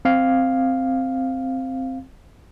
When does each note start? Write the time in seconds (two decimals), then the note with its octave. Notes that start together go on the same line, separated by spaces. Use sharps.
0.05 C4 F5